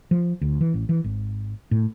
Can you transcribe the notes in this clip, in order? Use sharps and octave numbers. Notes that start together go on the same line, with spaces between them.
F3
D2
E3
A1
E3
G#1
A2